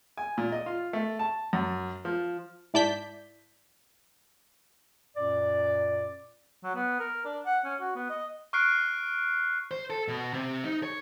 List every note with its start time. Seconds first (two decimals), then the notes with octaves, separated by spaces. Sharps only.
0.17 G#5
0.38 A#2
0.52 D#5
0.66 F4
0.93 A3
1.19 A5
1.53 F#2
2.05 F3
2.74 G#2 E4 D5 A5 G6 B6
5.17 F#2 A#2 D5
6.63 F#3
6.75 B3
6.99 A#4
7.25 D4
7.45 F#5
7.64 C#4
7.80 F#4
7.95 B3
8.09 D#5
8.53 C#6 F6 F#6 C7 D7
9.71 C5
9.90 A4
10.08 B2
10.33 C3
10.65 D#4
10.83 C#5